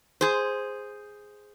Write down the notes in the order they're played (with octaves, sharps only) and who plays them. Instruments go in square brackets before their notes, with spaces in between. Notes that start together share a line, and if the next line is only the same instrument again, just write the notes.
[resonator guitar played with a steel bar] G#4 C5